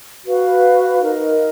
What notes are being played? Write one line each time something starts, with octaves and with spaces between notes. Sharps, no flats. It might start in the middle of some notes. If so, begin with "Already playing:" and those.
F#4 B4 F5
D#4 A#4 D#5